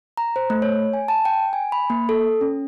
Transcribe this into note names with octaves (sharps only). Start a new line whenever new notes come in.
A#5
C5
A3
C#5
G#5
A5
G5
G#5
B5
A#3
A4
C#4